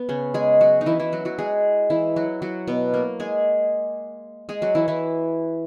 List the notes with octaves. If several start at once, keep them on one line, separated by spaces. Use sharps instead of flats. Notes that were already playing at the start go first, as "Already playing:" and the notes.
Already playing: B3
C#3 C#4
G#3 G#4
F#3 F#4
D#4
E3 E4
E3 E4
F#3 F#4
F#3 F#4
G#3 G#4
E3 E4
F#3 F#4
F#3 F#4
B2 B3
A#3
G#3 G#4
G#3 G#4
F#3 F#4
E3 E4
E3 E4